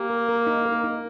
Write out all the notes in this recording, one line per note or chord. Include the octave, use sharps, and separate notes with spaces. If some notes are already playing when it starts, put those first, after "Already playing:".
Already playing: A#3 G4
A#4
A#4
D#4
A#4
D#4